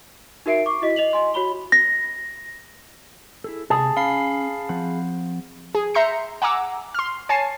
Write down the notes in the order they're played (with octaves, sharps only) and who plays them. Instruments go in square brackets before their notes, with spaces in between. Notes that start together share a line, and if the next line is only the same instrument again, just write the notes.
[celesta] D#4 F#4 A#4 E5 C7 D7
C#6 D6
E4 F#4 D#5 B6
D#5 F7 F#7
D#5 G#5 C6
F#4 C#5 B5 G7
A#6
[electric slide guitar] E4 G#4 A4
[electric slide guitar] C3 [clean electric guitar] G#4 [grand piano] A5
[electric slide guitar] C#4 [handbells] F5 B5 C7
[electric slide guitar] F3 C4 F#5
[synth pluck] G#4
E5 A#5 C6 G6 C7 C#7
F#5 G#5 A#5 D6 E6
C6 F6
C#5 G#5 A5 C7